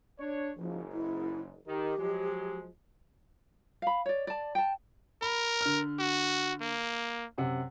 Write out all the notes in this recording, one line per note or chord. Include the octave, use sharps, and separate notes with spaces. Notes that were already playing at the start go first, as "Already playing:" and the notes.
D4 C#5
F#1 G#2 F3
E4
D#3 G4
F3 F#3 G#3
F5 B5
C#5 D5
D5 A5
G5 A5
A#4 B5
D3 F6
F#4
A#3
F#2 C3 F#5